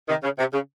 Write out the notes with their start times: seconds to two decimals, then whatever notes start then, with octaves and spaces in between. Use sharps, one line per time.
0.08 C3 D#3
0.23 C#3
0.39 C3
0.53 C#3